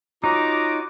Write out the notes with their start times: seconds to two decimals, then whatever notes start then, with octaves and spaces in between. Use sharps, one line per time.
0.24 F#3 D#4 F4 F#4 A#5 D6